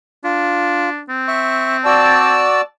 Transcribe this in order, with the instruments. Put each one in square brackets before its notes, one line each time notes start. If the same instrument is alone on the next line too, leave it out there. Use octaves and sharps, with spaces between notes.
[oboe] D4 [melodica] F4
[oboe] C4
[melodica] E5 C#6
[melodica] F#4 E6 [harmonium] D5 A5